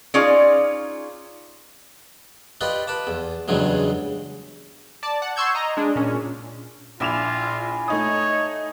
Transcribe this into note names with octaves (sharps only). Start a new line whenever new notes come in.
C#4 D#4 F4 G#4 D5
F4 G4 B4 D5 D#5
B4 A5 D6
E2
E2 G2 C#3 E3 F#3 G#3
D5 A5
F#5
C6 C#6 E6 G6 G#6
D#5 A#5
G#3 D4
A#2 C#4
A#1 E4 F4 G#5 D6 E7 F7
A3 D#4 C#5 D#6